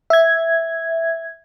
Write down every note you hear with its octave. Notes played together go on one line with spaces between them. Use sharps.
E5 G#6